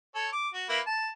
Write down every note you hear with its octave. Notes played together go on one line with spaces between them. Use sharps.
A4 C#5
D6
F#4
A#3 E4 B4
A5